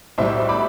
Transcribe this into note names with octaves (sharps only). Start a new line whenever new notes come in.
B1 A2 G3 C5 E5
B5 D6